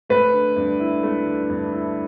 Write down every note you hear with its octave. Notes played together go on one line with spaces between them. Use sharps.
A3 B4
D3
G2
E4
A3
D3
G2
E4